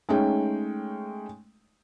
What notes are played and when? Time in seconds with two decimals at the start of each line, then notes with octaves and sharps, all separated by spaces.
0.09 G#3 A3 C#4 D#4 G5